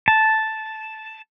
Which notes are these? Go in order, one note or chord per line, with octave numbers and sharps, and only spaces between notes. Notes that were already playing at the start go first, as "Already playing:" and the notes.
A5